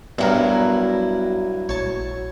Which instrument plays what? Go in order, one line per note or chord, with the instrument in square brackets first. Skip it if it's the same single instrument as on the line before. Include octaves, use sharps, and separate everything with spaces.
[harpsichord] G2 A#4 [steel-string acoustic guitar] F#3 E4 [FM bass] B3
[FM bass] A#1 [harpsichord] C#5 A5